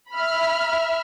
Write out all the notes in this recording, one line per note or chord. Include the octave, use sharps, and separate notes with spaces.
E5 B5 F6